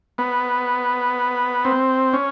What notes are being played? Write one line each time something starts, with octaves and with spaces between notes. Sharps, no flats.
B3
C4
C#4